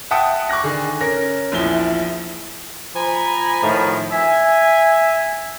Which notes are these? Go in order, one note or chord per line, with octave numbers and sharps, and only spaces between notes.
E5 F#5 G5 A5 D#6
C#6 D6 F#6 A#6
D3 D#3 G#4
C#4 A#4 A#6
A#1 E2 F3 E4 G7
F3 G#5 A#5 B5
A2 D#3 F3
E5 G#5